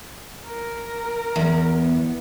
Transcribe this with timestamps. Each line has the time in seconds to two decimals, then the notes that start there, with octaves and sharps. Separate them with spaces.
0.46 A#4
1.36 E2
1.78 B3